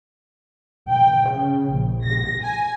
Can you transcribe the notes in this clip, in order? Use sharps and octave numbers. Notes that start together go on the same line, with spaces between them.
G5
C#3
A#1
A#6
G#5